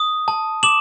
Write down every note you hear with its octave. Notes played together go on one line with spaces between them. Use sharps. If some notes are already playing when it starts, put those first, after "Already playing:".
Already playing: D#6
A5
D6 E7 F#7